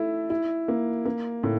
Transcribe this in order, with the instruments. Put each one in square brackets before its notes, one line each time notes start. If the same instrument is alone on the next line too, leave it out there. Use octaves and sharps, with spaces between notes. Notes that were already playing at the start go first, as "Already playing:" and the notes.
Already playing: [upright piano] A3 E4
E4
A#3
A#3
A2